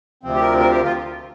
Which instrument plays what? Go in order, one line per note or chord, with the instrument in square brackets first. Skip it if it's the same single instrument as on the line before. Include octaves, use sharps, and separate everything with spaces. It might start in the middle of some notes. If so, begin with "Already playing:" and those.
[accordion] D2 C3 F3 C4
G4
A#4
A#4
G4
F4